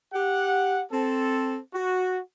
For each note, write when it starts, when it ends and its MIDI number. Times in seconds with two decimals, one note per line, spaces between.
0.13 0.81 67
0.13 0.81 78
0.91 1.57 60
0.91 1.57 69
1.73 2.19 66